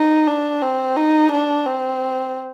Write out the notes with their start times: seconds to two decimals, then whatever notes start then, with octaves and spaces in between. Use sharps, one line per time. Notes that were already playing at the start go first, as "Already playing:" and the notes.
Already playing: D#4
0.27 D4
0.62 C4
0.96 D#4
1.32 D4
1.66 C4